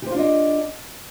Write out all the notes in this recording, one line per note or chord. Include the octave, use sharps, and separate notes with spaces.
D4 F4 G4 C5 D#5